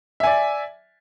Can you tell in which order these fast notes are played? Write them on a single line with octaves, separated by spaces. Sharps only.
E5 G#5 D5